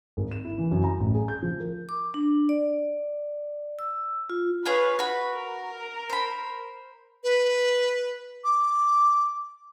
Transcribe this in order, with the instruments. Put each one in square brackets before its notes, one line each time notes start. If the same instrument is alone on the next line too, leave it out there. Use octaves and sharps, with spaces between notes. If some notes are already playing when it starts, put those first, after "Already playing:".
[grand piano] G#1
E7
E4
E3
F#2
A#5
A1
G#4
G6
F3
A#4
[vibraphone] D6
D4
D5
E6
F4
[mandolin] F4 G#4 C#5 [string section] B4
[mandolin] F#4 B5
[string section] A#4
[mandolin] C5 B5
[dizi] B4
D6